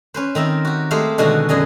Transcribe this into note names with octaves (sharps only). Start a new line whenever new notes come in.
C#4 B4 C5
D#3 C4 A#4 E5
F#4 G4
G#3 A3 G4 G#4 C5 F5
B2 D3 D#3 G#3 F#4
F#2 D3 G#4 D#5